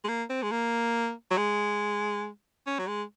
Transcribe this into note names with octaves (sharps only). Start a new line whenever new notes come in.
G#3
A#3
C4
G#3
A#3
F#3
G#3
C#4
F#3
G#3